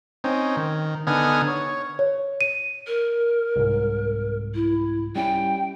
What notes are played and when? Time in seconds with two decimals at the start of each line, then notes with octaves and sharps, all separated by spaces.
0.24 C4 C#4 D#4
0.57 D#3
1.07 D3 B3 D#4 G#5 D#6 F6
1.48 C#5
1.99 C#5
2.41 D#7
2.87 A#4
3.56 C2 G#2
4.55 E4
5.16 G3 C#4 E4 G5